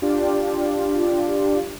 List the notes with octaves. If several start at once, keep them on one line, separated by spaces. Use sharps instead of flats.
D4 F4 G4 D5